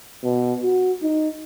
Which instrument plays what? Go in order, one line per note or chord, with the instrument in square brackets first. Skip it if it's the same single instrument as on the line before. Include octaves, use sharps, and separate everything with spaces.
[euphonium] B2
F#4
D#4